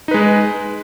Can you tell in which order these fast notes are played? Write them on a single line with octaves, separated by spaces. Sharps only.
D#4 B4 G#3